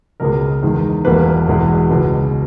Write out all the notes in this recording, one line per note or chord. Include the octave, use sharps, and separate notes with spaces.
C#2 B2 G#3 A#4
E2 D#3 G#3
E1 E2 B2 G3 A#3 B4
E1 E2 B2 G#3
C#2 B2 G#3